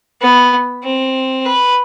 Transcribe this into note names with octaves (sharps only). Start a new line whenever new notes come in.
B3
C4
B4